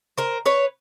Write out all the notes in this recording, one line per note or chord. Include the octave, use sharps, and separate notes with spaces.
A#4 C5
B4 C#5